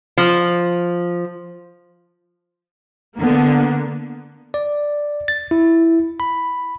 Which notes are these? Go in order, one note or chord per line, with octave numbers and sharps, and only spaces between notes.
F3
D3 A#3 B3
D5
A6
E4
B5